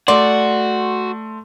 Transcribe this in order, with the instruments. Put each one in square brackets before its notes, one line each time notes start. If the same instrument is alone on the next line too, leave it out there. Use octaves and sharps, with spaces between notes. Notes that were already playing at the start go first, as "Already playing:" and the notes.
[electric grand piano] A3 C6 [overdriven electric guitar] F#4 [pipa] D5